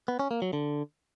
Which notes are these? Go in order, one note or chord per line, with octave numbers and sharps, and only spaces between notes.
B3
C#4
A#3
F#3
D3